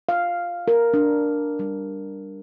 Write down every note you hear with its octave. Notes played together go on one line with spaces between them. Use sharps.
F5
A#4
D4
G3